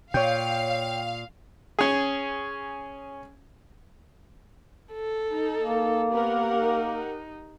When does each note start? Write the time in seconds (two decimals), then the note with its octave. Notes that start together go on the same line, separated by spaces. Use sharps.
0.14 A#2 C#5 F5 G5
1.79 C#4 G#4
4.92 A4
5.31 D#4
5.62 A#3
6.13 B3 G4 A#4 F#5
6.57 D#4